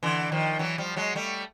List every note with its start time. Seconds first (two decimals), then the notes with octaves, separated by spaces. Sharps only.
0.03 D3 E3
0.32 D#3 F3
0.59 E3 F#3
0.78 F3 G3
0.96 F#3 G#3
1.15 G3 A3